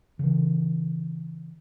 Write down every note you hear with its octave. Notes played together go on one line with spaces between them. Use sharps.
C#3 E3